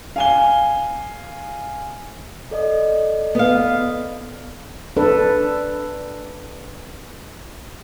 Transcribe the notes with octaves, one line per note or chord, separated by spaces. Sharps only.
F5 G#5 G7
A4 D5 D#5
B3 F5
D4 A4 B4